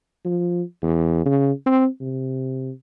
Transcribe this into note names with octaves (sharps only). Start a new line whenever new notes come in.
F3
E2
C#3
C4
C3